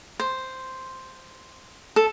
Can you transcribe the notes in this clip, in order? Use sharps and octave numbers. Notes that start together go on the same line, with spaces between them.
C5
A4